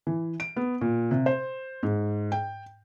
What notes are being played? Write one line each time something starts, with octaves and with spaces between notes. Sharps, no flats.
E3
D7
B3
A#2
C3
C5
G#2
G5